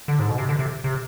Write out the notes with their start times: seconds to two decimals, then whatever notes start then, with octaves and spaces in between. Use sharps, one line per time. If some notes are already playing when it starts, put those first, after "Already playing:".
0.08 D3
0.19 G#2
0.29 B2
0.38 C3
0.49 D3
0.59 C3
0.84 C3